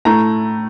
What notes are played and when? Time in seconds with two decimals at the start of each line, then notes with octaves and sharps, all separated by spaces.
0.05 A2 A3 A#5